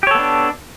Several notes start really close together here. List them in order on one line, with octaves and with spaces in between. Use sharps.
G4 C#5 A4 B3 D4